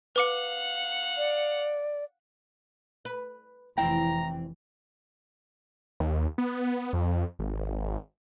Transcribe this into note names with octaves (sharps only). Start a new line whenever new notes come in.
B4 F5 F#5 D6 C#7
D5
B4
F1 E2 E3 C4 E4 G5 A#5
D#2
B3
F2
G#1